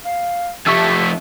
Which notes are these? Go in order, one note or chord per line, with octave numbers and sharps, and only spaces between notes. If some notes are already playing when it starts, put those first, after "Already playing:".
F5
F2 A3 G4 E5 C#6 E6